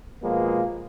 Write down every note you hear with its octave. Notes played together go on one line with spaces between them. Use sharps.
B2 F3 G#3 A#3 B3